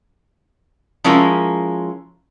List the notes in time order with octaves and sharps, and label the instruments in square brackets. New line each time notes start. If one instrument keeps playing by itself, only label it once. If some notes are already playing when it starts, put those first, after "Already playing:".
[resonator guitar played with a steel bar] F3 G#3 C#4 E4 A#4